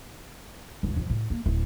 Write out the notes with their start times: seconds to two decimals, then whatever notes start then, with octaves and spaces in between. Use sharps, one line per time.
0.83 C#2 F#2
0.96 F2 F3
1.10 A2
1.30 A#3
1.46 D1 E4